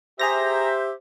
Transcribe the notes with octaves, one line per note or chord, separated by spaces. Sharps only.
G4 G#4 C5 E5 A#5 A#6